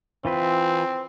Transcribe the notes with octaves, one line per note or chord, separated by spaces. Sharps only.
E3 C4 F4 B4